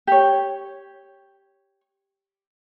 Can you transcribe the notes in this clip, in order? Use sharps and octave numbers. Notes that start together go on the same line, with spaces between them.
G4 C#5